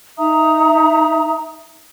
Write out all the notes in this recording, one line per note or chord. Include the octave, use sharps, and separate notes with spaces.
D#4 E5 A#5 D#6